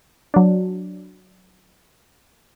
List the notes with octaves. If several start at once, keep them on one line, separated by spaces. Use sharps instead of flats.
F#3 D4